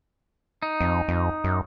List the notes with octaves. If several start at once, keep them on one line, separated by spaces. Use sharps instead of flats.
D#4
F2
F2
F#2